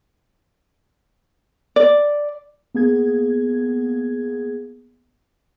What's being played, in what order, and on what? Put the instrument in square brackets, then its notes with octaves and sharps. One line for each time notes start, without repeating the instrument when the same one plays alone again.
[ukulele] D5
[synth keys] A#3 B3 G#4 G#6